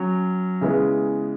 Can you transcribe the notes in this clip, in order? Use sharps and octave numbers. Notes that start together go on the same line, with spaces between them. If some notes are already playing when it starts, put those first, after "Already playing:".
Already playing: F#3 C#4
C#3 E3 G#3 B3